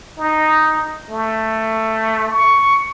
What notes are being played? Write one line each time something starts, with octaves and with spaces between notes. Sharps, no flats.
D#4
A3
C#6